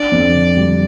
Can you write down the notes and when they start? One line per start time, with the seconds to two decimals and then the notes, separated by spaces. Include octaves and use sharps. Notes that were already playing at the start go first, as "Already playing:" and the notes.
Already playing: D4 D5
0.12 F2
0.34 D3
0.57 G3